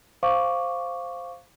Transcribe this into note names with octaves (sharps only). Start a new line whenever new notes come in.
C5 F5 C#6 D6